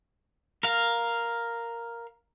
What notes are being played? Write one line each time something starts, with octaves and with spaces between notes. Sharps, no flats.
A#4 F5